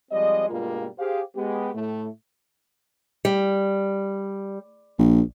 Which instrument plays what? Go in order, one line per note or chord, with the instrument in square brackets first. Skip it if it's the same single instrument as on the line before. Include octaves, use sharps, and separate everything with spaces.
[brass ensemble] F3 G3 G#3 C4 D#5
G2 B2 G3 G#3 A#3 F4
G4 G#4 C5 F5
G#3 B3 G4
A2 A3
[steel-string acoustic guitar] G3
[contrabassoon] A#1